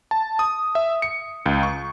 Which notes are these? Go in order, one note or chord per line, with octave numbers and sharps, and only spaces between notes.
A5
D#6
E5
C#7
C#2
C#6